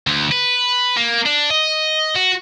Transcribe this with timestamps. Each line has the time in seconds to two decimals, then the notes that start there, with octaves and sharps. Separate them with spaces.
0.07 D2
0.32 B4
0.97 A#3
1.26 D4
1.50 D#5
2.15 F#4